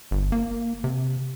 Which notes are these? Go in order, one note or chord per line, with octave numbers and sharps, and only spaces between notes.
G1
A#3
C3